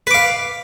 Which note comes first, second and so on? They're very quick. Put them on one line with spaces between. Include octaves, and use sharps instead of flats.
B4 D6 F5